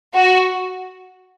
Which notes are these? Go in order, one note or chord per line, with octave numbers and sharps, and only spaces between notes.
F#4